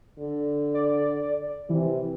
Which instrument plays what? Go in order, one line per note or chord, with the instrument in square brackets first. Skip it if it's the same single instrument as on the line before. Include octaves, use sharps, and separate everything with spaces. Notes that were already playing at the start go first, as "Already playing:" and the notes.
[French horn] D3
[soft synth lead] D5
[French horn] C3 [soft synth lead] E3